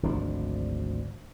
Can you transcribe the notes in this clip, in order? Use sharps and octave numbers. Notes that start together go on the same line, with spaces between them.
G#1 D2 F3 D4